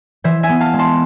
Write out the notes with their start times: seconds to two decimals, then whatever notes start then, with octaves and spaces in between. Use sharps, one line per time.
0.24 E3 C5 E5
0.43 E5 G#5
0.49 B3
0.61 F5 A5
0.73 G#3
0.79 A5 C6